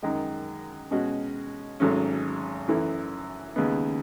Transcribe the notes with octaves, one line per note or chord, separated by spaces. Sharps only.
F#2 D#3 G#3
B2 G#3 C#4 F#4
G#1 G#2 F#3 A3 C#4
F#2 E3 A3 C#4 E4
D#2 C#3 G#3 B3